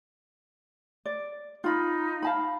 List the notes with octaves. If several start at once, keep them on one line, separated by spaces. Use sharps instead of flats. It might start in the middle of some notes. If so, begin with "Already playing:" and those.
D5
D#4 F4 B5
F5 A5 B5